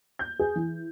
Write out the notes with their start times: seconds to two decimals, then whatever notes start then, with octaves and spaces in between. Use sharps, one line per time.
0.19 G6
0.39 G#4
0.55 E3